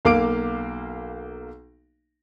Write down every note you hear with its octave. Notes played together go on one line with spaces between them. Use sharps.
B1 A#3 F5 D6 D7